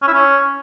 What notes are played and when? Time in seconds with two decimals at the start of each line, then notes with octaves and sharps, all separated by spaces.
0.02 C#4
0.08 E4
0.13 C#4